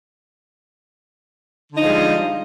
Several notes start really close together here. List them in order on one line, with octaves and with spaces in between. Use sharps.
D3 D#4 F3 G#3 G3